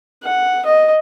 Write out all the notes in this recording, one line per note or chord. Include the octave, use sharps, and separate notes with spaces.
F#5
D#5